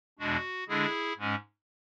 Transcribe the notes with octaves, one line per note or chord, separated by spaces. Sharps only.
E2 B2 G#3 D4 F#4
D3 G#3 D4 E4 G#4
G#2 G#3 C#4